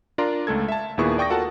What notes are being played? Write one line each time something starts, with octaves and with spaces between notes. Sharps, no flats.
D4 F4 A#4 D5 A#5 C6
C#2 A3 A4 G#6
E5 A5
D#2 A#2 B3 E4 G#4 C#6
D5 G5 C#6 D#6 A#6
F4 F#4 A4 A#4 F#5 A5